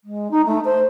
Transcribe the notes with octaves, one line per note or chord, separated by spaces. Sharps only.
G#3
D#4
A3
C5